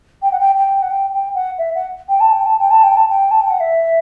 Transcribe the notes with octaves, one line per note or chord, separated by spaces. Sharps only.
G5
F#5
G5
G5
F#5
G5
G5
F#5
E5
F#5
G5
A5
G5
A5
G5
A5
G5
A5
G5
A5
G5
F#5
E5